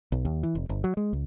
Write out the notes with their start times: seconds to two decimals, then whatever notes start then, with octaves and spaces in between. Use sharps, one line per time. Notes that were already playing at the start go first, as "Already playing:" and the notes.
0.12 B1
0.25 D#2
0.43 E3
0.55 F1
0.69 G1
0.84 F#3
0.97 G#3
1.13 C#2